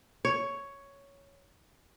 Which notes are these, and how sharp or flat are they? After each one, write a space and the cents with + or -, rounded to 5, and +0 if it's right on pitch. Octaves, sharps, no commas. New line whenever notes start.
C#5 +5